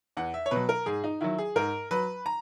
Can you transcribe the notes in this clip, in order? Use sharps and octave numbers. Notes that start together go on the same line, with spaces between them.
E2 F#5
E5
C#5
B2 F#3 B4
A#4
G#2 G#4
D#4
D#3 F#3 E4
G#4
G#2 A#4
F#3 B4
A#5